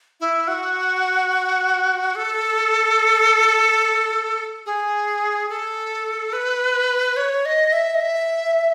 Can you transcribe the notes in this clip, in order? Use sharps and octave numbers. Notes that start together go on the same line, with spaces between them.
E4
F#4
A4
G#4
A4
B4
C#5
D#5
E5
D#5
E5